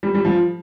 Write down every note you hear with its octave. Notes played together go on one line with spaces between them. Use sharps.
G3
G3
F3